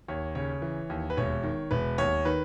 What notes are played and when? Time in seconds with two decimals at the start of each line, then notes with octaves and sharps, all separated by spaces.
0.08 D#2 C#5
0.35 C#3 C#5
0.62 E3
0.90 D#2
1.10 B4
1.17 E1 C#5
1.43 D#3
1.71 E1 B4
1.98 D#2 C#5
2.25 D#3 B4